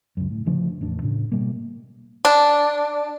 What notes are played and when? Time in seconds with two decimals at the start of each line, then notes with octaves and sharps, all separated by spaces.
0.17 C#2 F#2
0.30 A2
0.46 D2 C#3 F3 D4
0.81 A1 E2 D4
1.02 A2 C#3
1.32 B2 G3 A#3
2.25 D4